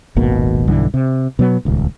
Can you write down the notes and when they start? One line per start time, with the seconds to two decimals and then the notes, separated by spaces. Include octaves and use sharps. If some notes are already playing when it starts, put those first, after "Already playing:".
0.16 D#1 G#1 B2 A#3
0.68 B1 G2 D3 E3
0.94 C3
1.39 B2 F#3 B3
1.65 D#1 C#2